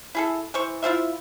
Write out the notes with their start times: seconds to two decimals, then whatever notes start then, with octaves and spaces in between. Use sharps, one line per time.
0.15 E4 G#4 A4
0.54 E3 C5 C#6
0.82 E4 F4 C5 E5